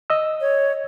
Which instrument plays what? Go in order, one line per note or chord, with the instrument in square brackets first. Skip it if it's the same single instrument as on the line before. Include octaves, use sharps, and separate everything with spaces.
[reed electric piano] D#5 E6
[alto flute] C#5